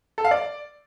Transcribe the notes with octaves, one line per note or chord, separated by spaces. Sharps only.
A4
F5
D5